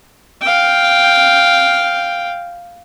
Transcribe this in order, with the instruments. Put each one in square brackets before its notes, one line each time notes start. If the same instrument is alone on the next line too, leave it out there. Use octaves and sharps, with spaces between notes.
[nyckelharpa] F5 G5